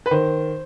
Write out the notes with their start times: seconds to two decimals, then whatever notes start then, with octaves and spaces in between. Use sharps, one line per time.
0.06 B4
0.11 D#3 C5